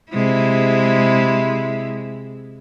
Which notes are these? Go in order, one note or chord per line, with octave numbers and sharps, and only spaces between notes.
C3 G#3 E4